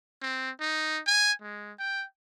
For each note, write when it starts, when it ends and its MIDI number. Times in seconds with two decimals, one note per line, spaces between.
0.22 0.50 60
0.60 1.00 63
1.06 1.33 80
1.42 1.72 56
1.79 2.05 79